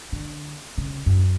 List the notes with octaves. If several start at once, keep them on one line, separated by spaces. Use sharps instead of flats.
D3
C#3
F#2